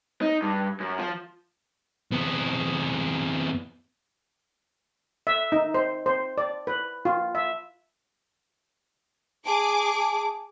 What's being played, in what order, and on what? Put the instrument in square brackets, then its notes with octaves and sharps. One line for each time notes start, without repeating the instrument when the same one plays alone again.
[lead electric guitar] D#4
G2
F#2
F3
F2 B3
[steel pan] E5
D#4
C5
C5
D5
B4
F4
E5
[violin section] G#4 D6 [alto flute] A5